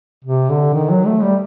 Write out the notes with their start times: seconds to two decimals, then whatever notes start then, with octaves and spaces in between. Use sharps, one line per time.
0.25 C3
0.50 D3
0.74 D#3
0.90 F#3
1.06 A3
1.23 G3